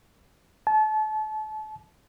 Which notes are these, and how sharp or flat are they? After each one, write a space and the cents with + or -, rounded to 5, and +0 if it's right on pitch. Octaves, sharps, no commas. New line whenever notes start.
A5 -35